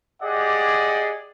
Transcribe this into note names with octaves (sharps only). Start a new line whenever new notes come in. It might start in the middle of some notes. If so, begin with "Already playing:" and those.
G4 G#4 D5 D#5 F#5